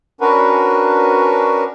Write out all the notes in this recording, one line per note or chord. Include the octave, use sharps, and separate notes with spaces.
C#4 D4 F#4 A#4 B4